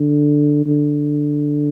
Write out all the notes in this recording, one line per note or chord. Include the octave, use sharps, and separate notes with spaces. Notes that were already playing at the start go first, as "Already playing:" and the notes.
Already playing: D3
D3